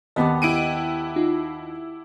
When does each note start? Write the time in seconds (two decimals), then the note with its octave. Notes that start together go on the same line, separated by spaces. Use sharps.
0.16 D#2 B3 G4 D#5 F#5 A5
0.42 E4 D7 D#7
1.16 D#4 F4